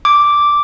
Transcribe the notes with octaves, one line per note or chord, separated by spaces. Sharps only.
D6